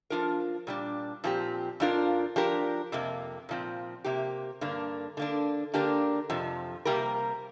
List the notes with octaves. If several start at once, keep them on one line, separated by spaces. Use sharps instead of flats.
F3 D4 F4 A#4
A#2 G3 D4
A#2 F3 C4 G4
F2 F3 D4 F4 A#4
F3 D4 G4 A#4
F2 C3 A#3
A#2 F3 C4
C3 A#3 G4
G2 D3 A#3 D4 A#4
D3 A#3 D4
D3 A#3 D4 G4 A#4
F2 C3 F3
C3 G3 A#3 G4 A#4